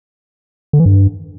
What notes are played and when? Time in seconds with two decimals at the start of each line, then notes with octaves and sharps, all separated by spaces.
0.73 D3
0.79 E3
0.86 G2